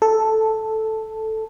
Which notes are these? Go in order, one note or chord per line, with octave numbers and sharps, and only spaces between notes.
A4